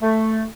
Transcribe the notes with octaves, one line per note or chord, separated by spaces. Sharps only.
A3